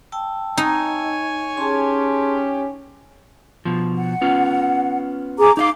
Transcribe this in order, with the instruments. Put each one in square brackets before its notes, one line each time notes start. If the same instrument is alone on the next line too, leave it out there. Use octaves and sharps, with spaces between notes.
[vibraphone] G5 A5 E6
[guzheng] D#4 [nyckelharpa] C#5 G#5
[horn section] C#4 G4 [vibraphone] G#4 A5 C6
[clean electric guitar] B2 F3
[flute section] F#5
[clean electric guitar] B3 C#4 F4
[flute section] G#4 A#5 D6
[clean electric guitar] D#4 E5 F5 [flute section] D6